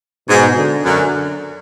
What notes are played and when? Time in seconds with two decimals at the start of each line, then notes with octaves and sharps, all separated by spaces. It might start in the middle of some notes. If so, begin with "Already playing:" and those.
0.29 G#2 B2
0.57 D3
0.85 F#2 D3